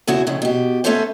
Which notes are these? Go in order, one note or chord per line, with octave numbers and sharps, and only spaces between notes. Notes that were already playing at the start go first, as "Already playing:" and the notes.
E2 C#3 E4 F#4
F2 A2 C#3
B2 G4
A3 B3 C#4 A4 C5 C#5